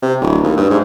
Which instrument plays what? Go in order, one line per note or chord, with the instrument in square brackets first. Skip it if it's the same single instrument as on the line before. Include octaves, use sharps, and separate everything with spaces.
[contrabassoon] C3
D1
D#2
G2
G#2